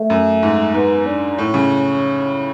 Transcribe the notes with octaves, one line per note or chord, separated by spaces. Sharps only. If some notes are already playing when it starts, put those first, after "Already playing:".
Already playing: A3
F#2
G#2
G#2 B3
D4
A2 C#4
C#3